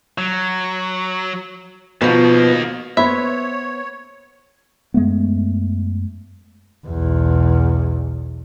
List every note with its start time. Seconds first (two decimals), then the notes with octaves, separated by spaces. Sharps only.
0.18 F#3
2.01 B2 D#3 F3 A#3
2.97 B3 C5 C#5 E5 B5
4.94 F#2 G#3 A3 B3
6.87 B1 E2